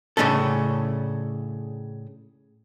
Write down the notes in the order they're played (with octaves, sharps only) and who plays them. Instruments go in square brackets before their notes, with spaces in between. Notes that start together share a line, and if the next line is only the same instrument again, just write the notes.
[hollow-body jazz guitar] A2 C#3 A3 C#4 D4 A4